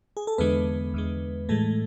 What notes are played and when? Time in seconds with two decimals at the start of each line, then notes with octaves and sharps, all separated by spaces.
0.17 G#4
0.27 A4
0.38 E2 D3 G#3 B3 B4
0.94 E2 D3 G#3
1.49 A2 E3 G#3 A3 A4